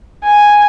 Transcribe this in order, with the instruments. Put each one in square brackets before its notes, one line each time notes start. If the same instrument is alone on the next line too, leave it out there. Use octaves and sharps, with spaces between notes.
[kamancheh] G#5